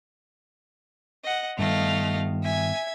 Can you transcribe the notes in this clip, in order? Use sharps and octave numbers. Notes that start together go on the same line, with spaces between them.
D#5 F#5
G2 D#3 A3 B3 D#5 F5 F7
E5 G#5 G#6